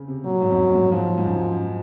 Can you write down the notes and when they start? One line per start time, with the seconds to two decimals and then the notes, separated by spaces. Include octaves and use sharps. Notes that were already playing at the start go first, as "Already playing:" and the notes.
Already playing: C#3 C4
0.08 C3
0.25 A#2 F#3
0.42 G#2
0.50 F2
0.59 F#2
0.69 A#2
0.76 G#2
0.92 G#2 F3
1.18 G#2
1.25 F#2
1.42 F#2